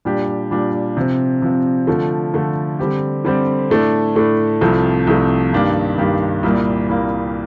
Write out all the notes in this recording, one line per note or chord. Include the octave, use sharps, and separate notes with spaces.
A#2 G3 D4 G4
A#2 G3 D4 G4
C3 F3 C4
C3 F3 C4
D3 F3 A3
D3 F3 A3
D3 G3 C4 G4
D3 G3 C4 G4
A2 A3 D4
A2 A3 D4
C2 C3 F3 A3
C2 C3 F3 A3
G2 D#3 A#3 D4 G4
G2 D#3 A#3 D4 G4
C2 A#2 G3 A#3
C2 A#2 G3 A#3